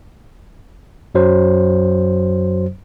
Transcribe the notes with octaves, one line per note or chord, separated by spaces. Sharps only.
F#2 F#3 C5